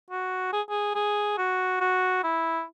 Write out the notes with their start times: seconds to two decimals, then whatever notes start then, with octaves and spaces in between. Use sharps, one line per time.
0.11 F#4
0.53 G#4
0.70 G#4
0.95 G#4
1.38 F#4
1.80 F#4
2.24 E4